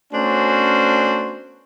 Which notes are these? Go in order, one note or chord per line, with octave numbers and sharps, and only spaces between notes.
A3 B3 C#4 D4 F#4 C5